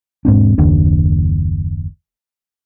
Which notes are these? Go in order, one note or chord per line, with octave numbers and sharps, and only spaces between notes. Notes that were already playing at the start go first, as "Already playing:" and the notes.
E1 G#2 C4 D4
F#1 D#2 D4